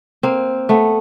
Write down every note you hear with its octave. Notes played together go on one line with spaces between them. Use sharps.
A#3 C4
A3 B3